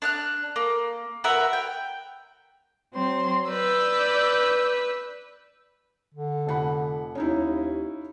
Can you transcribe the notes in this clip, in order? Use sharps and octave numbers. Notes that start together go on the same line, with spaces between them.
D4 F6 F#6
A#3
F#4 A#4 B4 E5
G5
F#3 C4 C6
B4 D5 E6 G6
D3
F1 F#5 B5
D#2 C#4 D#4 E4